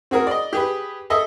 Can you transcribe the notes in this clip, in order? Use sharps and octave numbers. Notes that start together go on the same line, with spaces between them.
C4 F#4 G#4 A#4
D5 D#5
G4 G#4 B4
G#4 A4 D#5 E5